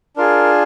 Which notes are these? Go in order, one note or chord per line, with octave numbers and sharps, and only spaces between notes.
D4 F4 G#4 A#4